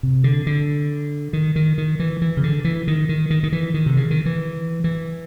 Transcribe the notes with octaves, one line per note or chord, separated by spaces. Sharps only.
C3
D3
D3
D#3
D#3
D#3
E3
E3
C#3
D3
E3
D#3
D#3
D#3
D#3
E3
D#3
C3
C#3
D#3
E3
E3